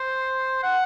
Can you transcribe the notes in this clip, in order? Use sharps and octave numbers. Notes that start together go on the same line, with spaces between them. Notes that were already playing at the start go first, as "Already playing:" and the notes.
Already playing: C5
F#5